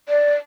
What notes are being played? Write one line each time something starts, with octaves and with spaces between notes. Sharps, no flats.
D5